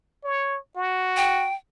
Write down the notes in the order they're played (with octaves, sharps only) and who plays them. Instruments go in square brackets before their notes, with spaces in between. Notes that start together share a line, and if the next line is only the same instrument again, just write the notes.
[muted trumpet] C#5
F#4
[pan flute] G5